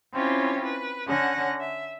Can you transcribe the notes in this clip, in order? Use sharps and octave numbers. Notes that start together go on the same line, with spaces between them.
C4 C#4 E4 F4 G4 C#5
B4
D3 C#4 F#5 A#6
E5